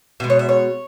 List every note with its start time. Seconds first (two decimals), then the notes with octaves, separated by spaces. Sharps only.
0.20 B2 G#3 E5
0.30 C#5
0.39 E5
0.49 C#5